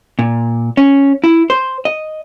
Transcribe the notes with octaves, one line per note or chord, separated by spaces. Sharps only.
A#2
C#4
E4
C5
D#5